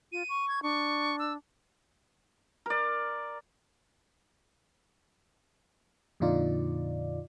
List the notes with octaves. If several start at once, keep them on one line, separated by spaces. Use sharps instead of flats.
F4 D#7
C#6
G#6
D4 C#6
E6
A#4 D5
F2 A#2 D3 D#4 F4 D5